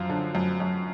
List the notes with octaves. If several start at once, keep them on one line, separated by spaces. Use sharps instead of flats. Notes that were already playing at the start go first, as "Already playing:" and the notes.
Already playing: F#2 F3 F4
D3
F#2
F#2